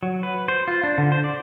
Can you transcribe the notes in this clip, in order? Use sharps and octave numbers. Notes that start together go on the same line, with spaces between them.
F#3
B4
C5
F4
D4
D3
C5
D5